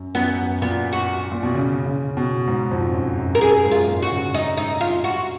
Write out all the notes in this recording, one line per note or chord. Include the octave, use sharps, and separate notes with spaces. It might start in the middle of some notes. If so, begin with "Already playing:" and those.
Already playing: F#2
F#2 B3
A#2 B3
F#4
A#2
B2
C#3
C#3
B2
G#2
F2
F#2
F#2
A#4
F#2 G#4
G#2
F4
A#2
F#4
C#3
D#4
D#4
F4
F#4